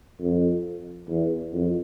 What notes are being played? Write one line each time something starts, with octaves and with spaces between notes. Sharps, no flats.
F2
E2
F2